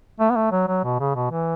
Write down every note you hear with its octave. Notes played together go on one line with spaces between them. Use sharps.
A3
B3
A3
F#3
F#3
B2
C#3
B2
E3